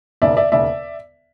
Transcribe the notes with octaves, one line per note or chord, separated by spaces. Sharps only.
E1 D#2 C#3 D5 E5
D5 E5
E1 D#2 C#3 D5 E5